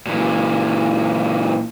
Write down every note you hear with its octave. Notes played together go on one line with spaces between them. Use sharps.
A#2 E3